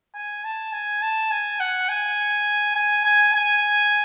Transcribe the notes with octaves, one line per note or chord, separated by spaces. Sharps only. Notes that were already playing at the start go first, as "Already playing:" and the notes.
G#5
A5
G#5
A5
G#5
F#5
G#5
G#5
G#5
G#5